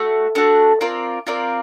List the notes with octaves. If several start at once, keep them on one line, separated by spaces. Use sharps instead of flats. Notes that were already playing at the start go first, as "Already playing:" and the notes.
Already playing: A3 F#4
A3 D4 F#4
C4 F4 A#4 D5
C4 F4 A#4 D5